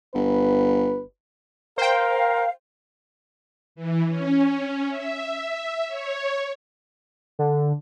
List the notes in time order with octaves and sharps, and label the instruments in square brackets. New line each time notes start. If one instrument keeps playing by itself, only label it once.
[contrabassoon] G1 [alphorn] B4
[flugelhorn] A#4 [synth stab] C5 G5 [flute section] F5
[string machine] E3
C#4
E5
C#5
[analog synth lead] D3